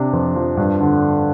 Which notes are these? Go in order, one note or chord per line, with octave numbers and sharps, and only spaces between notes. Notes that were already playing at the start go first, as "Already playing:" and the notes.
Already playing: C3 D4
F2
F3
G2
D3